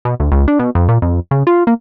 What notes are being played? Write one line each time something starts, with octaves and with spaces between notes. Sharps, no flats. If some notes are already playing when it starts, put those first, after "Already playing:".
B2
D2
C#2
D4
B2
F2
A#2
F2
C#3
F4
A#3